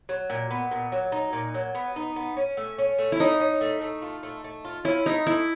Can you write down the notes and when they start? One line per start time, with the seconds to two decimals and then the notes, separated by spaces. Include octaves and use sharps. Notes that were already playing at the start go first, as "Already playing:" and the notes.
0.09 F#3
0.30 A#2
0.51 B3
0.71 A#2
0.92 F#3
1.12 D#4
1.33 A#2
1.54 F#3
1.75 B3
1.96 D#4
2.16 B3
2.37 C#4
2.57 A3
2.78 C#4
2.98 A3
3.12 E4
3.20 C#4 D#4
3.40 C#4
3.61 A3
3.82 A3
4.02 F4
4.23 A3
4.44 A3
4.65 F4
4.85 C#4 E4
5.06 A3 D#4
5.27 A3 E4